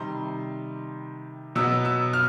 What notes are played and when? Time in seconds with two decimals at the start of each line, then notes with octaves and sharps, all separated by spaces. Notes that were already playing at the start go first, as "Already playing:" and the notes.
Already playing: C3 D#3 G3 C6
1.55 B2 F#3 B3 E6
1.85 E6
2.13 F6